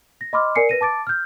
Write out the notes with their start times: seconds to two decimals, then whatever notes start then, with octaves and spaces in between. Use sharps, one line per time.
0.21 A#6
0.33 D#5 B5 C6 D6 F6
0.55 A#4 D5 G#5 C7 C#7
0.69 B4 A#6 D#7
0.81 A5 D6 A6 D7
1.07 F6 G6